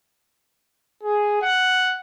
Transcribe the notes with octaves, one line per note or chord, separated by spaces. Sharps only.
G#4
F#5